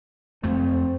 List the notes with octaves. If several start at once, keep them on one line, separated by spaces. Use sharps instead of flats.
F2 A3 C4